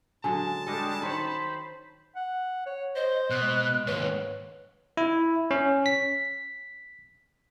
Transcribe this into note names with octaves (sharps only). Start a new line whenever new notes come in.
D3 F#3 G#3 G#5 A5
G3 G#3 D4 A4 D#5
D#3 C5 C#5 B5
F#5
C#5
C5 D#5
B2 F#6
G#3
D#2 G#2 B4 C#5
E4
C#4
B6